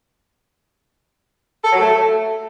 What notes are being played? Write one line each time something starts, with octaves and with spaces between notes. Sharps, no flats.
A4
F#3
A3